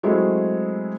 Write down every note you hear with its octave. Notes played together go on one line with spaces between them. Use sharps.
F#3 G#3 A3 C4 E4 G#4